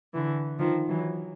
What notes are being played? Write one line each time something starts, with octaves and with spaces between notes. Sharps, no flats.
D3 E3
D#3 F3
E3 F#3